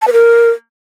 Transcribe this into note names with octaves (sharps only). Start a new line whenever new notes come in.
A5
B4
A#4